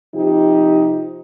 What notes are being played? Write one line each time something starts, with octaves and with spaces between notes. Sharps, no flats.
C3 F3 D#4 G4